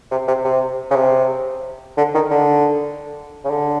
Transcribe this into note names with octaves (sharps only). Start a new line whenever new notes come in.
C3
C3
C3
C#3
C3
D3
D#3
D3
C#3
D3